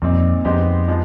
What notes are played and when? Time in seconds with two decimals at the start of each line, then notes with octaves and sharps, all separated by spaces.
0.02 F2 A#2 G3 C4 D#4
0.45 F2 G#3 B3 D#4 G4 C5
0.88 F3 G#3 B3